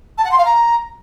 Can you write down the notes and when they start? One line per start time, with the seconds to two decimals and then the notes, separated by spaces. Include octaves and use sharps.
0.18 A5
0.25 F#5
0.31 C6
0.38 F5
0.45 A#5